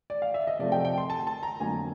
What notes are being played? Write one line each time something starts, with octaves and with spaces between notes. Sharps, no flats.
D5
F5
E5
D#5
C3 F3 A3 D5
G5
G5
C6
A5
A5
A#5
F2 D3 F#3 A#3 G#5